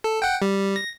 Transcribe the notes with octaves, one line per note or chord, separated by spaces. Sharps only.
A4
F#5 G5
G3
A#6